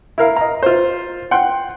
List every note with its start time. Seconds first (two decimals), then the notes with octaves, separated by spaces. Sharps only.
0.18 E4 A#4 F5
0.36 D#5 A#5
0.63 F4 C5
1.31 F#5 G5 C6